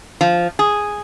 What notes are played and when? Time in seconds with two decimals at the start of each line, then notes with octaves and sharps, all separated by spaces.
0.21 F3
0.59 G#4